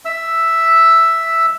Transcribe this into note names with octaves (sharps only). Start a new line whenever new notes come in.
E5 E6